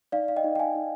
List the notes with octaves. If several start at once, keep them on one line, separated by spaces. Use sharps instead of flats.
D#4 D5 F5
F5
D#5 G5
D#4
G5
F5 G#5
D#4